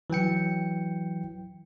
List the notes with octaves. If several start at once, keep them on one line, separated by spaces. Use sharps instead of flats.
E3 F#3 G5 C#7